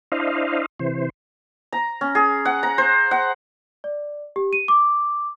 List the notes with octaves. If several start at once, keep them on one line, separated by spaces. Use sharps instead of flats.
D4 E4 C5 D#5 F5
C3 E3 C5
A#5
C#4
G#4
F#5
A#5
C5
F#5
D5
G4
D#7
D6